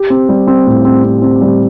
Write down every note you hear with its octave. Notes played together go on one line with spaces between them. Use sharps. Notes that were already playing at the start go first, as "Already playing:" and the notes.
Already playing: G4
C4
G3
C4
A2
C4
C4
C4
G3